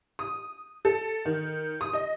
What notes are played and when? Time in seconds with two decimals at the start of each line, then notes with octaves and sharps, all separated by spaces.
0.19 D#6
0.85 A4
1.25 D#3
1.81 D#6
1.93 D#5